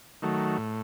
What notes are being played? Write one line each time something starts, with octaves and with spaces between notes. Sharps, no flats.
D#3 F#3 A3
A2